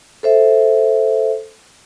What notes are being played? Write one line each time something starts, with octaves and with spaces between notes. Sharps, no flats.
A4 C5 E5